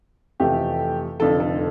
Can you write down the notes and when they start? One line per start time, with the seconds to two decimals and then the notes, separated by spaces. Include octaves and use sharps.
0.40 F2 C3 E3 A3 G4
1.20 F1 F2 D3 A4
1.40 A4